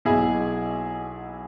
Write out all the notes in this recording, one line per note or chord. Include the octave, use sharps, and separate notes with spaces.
B1 B2 E4 G#4